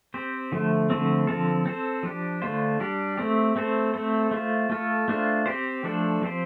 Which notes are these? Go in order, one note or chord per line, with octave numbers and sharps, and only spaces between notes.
C4 G4 C5
D3 F3 A3
D3 F3 A3 C4
D3 F3 C4 A4
C4 A4 C5
F3 D4 G4
D3 A3 D4 F4 C5
G3 D4 G4
A3 C4 G4
A3 C4 A4 C5
A3 C4 A4 C5
A3 F4 C5
A3 F4 A4
A3 D4 F4 C5
C4 G4 C5
F3 A3 D4 A4 C5
F3 C4 G4 C5